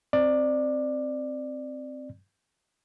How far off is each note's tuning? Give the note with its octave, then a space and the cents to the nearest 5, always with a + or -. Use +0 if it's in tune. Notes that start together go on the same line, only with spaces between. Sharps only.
C4 +0 D5 +15